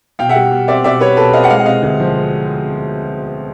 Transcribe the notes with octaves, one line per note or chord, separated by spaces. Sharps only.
B2 F5 G5
E5 F#5
G3
B2
C4 D5 E5
B2 D5 E5
G3 B4 C#5
B2 A4 B4
C4 D#5 F5
F#5
G#3 D#5 F5
F#5
C3 D#5 F5
D2
F3
G#3